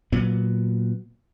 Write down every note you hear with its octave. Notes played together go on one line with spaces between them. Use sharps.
A#2 F#3 B3